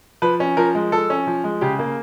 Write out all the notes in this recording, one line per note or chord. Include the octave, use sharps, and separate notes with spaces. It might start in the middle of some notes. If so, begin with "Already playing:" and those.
F3 B4
C#4
F3 A#4
G#3
F3 A4
C#4
F3
G#3
C#3 G4
A#3